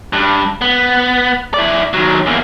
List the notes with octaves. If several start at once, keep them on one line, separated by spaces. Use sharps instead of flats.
G2
B3
E4 D5
D#3 F#3
E2 A#3